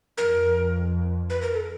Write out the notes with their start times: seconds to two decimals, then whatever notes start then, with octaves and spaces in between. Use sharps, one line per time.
0.18 F2 A#4
1.30 B4
1.42 A#4
1.54 A4